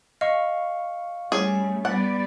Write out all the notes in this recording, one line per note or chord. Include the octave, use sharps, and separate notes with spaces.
D#5 F5 C#6
G3 A3 C#4 G#4
G3 B3 D5 F#5